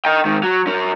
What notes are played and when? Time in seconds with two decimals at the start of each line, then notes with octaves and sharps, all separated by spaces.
0.05 D#5 G5
0.25 G#2 D#3
0.43 F#3
0.67 F#2 C#4